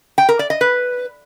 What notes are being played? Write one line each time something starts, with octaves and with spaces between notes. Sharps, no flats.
G5
A#4
D5
D#5
B4